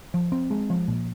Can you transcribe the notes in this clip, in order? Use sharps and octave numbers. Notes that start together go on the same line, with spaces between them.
F3
C4
G#3
F3
A#2